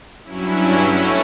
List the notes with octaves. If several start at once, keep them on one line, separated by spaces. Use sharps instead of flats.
G2 F#3 C#4 E4
B2 A3 C#4 E4